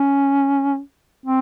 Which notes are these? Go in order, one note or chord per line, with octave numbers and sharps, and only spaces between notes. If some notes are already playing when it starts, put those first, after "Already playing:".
Already playing: C#4
C4